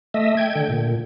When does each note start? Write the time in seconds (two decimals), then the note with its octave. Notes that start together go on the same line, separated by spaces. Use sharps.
0.14 A3 D#5 E5
0.37 G5 G#6
0.55 D3 G5
0.69 A#2